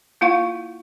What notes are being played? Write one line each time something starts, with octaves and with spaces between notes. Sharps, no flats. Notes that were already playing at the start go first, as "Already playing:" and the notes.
A#3 E4 F4 F5 F#5 C#6